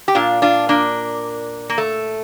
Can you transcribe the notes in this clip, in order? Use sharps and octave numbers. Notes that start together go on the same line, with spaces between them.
G4
A#2 D4 F4
D4 F4
A#3 D4
A#3
A3